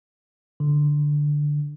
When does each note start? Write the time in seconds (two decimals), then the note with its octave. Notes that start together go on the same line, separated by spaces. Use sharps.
0.60 D3